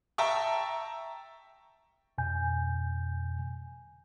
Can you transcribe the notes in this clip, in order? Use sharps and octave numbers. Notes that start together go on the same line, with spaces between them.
E5 G5 A5 A#5 C#6
F2 B2 G#5 G6